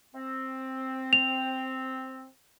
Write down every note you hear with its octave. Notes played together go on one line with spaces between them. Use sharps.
C4
F7